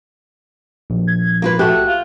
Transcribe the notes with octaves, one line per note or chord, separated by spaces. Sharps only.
A#1
G#6
A#3 F4 B4
A3 F#4 G4 F#6
F4